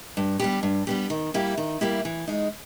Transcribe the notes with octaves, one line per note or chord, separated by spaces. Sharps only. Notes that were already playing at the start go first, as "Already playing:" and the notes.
G2
G3 B3 G4
G2
G3 B3 G4
D#3
G3 A#3 E4 G4
D#3
G3 A#3 E4 G4
E3
G#3 D#4